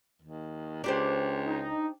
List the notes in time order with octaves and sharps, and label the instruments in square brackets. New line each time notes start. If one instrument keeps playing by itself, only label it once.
[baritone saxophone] D#2
[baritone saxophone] C#2 [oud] D4 G4 C5
[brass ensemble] D#4